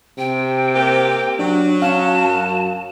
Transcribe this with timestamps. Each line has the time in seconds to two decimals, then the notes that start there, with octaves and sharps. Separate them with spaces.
0.18 C3 G5
0.75 A#3 C4 G4
1.39 F#3 D4
1.82 C#4 F5 A5
2.25 F#2